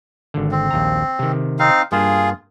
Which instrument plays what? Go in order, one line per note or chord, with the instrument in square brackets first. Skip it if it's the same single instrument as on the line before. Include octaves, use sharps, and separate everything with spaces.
[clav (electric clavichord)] G#1 D3
[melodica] C4
[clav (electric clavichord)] A#1 D#2 A#5
C3 D#3
[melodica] C4 D#4 F5
[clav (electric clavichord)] G2 A#3 [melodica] F4 G#4